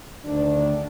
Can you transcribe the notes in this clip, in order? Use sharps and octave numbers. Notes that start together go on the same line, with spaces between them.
D2 D#3 D4